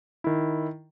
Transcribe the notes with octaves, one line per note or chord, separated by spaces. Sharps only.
D#3 E4